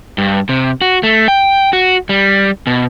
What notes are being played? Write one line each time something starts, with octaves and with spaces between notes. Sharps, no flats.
G2
C3
F#4
A3
G5
F#4
G3
B2